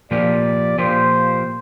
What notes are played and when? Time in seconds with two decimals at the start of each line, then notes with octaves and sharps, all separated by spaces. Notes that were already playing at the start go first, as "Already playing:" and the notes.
0.11 A#2 F3 A#3 G4 D5
0.78 A#2 F3 A#3 G4 C5